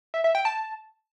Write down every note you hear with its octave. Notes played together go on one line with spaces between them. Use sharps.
E5
E5
G5
A5